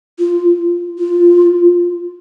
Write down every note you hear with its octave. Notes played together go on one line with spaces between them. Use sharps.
F4
F4